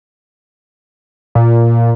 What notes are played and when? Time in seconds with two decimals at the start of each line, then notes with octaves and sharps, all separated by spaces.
1.35 A#2